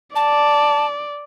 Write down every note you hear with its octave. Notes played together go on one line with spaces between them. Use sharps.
D5 A5